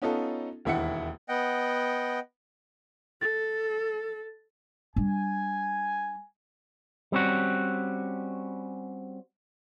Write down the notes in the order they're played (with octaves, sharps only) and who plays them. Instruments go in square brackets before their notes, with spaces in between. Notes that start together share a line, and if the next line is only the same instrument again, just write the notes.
[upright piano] B3 C#4 D#4 F4 A4
E1 D#2 E4 E5 F#5 C#7
[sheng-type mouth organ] B3 D#5 F#5 G5
[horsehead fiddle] A4 [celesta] A6
[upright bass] G3 D4 [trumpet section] G#5
[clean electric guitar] G3 C4 C#4 F#4